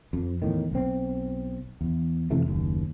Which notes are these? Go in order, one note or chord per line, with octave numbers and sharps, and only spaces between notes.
F2
E2 A2 D#3
B1 C4
E2
F2 C3 E3 A3
F#1 D#2